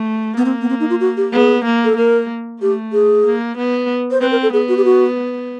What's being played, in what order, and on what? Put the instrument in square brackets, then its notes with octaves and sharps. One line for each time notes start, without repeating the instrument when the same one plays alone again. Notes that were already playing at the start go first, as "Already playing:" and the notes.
Already playing: [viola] A3
[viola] A#3 [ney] B3
[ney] C4
B3
C4
D#4
F4
F#4
G4
[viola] B3 [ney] G#4
[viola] A#3
[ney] A4
[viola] A#3 [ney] A#4
[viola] A3 [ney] G4
[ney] G#4
[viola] A#3
B3
[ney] C5
[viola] C4 [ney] B4
[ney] A#4
A4
[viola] B3 [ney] G#4
[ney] F#4
G4
F#4